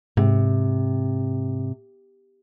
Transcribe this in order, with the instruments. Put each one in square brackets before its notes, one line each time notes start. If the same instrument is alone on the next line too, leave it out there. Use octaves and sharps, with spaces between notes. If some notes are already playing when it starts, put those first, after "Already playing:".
[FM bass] G#2 [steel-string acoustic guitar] C3